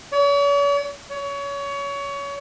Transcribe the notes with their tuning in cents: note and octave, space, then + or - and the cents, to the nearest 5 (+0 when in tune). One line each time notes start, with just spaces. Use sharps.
C#5 +45
C#5 +25